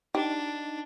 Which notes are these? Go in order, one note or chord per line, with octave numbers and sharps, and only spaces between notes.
D4 D#4 G4